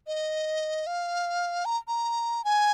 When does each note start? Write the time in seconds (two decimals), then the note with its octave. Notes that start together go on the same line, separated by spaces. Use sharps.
0.07 D#5
0.87 F5
1.65 A#5
1.88 A#5
2.44 G#5